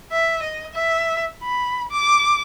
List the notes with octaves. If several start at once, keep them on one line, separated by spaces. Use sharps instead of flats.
E5
D#5
E5
B5
D6